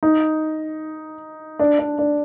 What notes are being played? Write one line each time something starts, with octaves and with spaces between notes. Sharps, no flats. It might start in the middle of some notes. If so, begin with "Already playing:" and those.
D#4
D4
D4
D4